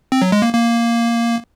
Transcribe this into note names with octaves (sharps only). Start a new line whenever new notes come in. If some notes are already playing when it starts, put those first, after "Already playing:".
C4
F#3
G#3
A#3
A#3